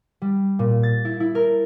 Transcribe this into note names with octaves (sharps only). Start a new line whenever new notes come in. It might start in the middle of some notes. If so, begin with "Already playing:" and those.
G3
A#2
A6
E4
E4
A#4